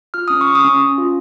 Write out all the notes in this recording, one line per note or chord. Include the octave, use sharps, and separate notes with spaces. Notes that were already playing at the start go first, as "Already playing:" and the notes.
F4 F6
C#4 D#6
C#6
C#4
D#6
C#4
C#4
F4